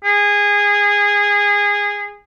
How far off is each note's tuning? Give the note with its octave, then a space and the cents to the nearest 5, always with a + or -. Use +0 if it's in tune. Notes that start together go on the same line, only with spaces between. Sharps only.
G#4 -20